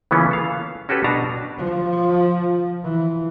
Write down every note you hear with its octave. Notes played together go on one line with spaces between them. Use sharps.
C#3 E3 A#3 B3 C#4 F4
A4 F5
C#4 F#4 G4 A4 B4
B2 D4 A5 A#5
F3
E3